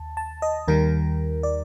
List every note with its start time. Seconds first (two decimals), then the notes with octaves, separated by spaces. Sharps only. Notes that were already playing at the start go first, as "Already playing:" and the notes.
Already playing: D#2 A5
0.17 A5
0.42 D#5
0.68 D#2 D#3 G3 A#4
1.43 D5